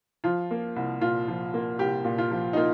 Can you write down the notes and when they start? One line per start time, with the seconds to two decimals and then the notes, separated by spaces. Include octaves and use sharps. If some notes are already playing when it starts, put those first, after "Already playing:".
0.24 F3 F4
0.51 A#3
0.76 C2
1.01 A#2 F4
1.28 F3
1.54 A#3
1.79 C2 G4
2.05 A#2
2.18 F4
2.31 F3
2.53 D#4
2.57 A#3 F4